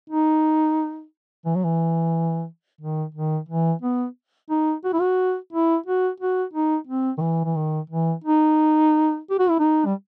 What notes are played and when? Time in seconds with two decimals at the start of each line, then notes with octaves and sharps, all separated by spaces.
0.10 D#4
1.45 E3
1.55 F#3
1.64 E3
2.81 D#3
3.14 D#3
3.49 E3
3.82 B3
4.50 D#4
4.84 F#4
4.93 E4
5.01 F#4
5.53 E4
5.86 F#4
6.20 F#4
6.53 D#4
6.87 C4
7.18 D#3
7.21 E3
7.44 E3
7.56 D#3
7.90 E3
8.24 D#4
9.30 G4
9.39 F#4
9.49 E4
9.59 D#4
9.86 G3